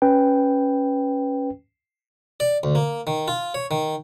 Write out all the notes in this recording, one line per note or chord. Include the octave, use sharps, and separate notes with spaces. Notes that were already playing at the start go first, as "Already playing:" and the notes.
C#4 B4 G5
D5
D2
A#3
D#3
F4
C#5
D#3